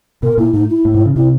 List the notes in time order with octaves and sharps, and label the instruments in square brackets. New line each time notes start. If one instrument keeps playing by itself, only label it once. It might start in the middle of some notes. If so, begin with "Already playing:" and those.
[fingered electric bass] B2 [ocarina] A#4
[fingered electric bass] A#2 [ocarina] E4
[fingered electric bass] A2 [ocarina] D#4
[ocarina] E4
[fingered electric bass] A2
G#2
C#3
[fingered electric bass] C3 [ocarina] E4